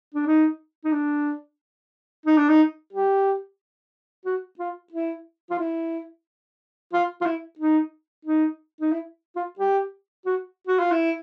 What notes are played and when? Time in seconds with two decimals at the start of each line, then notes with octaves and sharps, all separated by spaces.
0.14 D4
0.26 D#4
0.84 D#4
0.92 D4
2.26 D#4
2.37 D4
2.49 D#4
2.93 G4
4.25 F#4
4.59 F4
4.92 E4
5.51 F4
5.59 E4
6.93 F4
7.21 F4
7.26 E4
7.59 D#4
8.25 D#4
8.81 D#4
8.92 E4
9.36 F4
9.59 G4
10.26 F#4
10.67 F#4
10.79 F4
10.92 E4